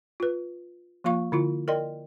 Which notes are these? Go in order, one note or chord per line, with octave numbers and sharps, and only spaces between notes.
F4 B4
F3 A#3 F4 F5 C#6
D3 E4 F4
A#4 D5 D#5 G5 C6